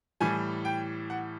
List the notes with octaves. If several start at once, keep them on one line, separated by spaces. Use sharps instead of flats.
A2 E3 G3 G#5
G5
F#5